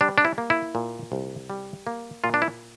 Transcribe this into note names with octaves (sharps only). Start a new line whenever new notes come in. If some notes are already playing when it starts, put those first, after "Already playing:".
G3 D4
D4
E4
A#3
E4
A#2
C2
G3
A#3
A#2 F4
D4
E4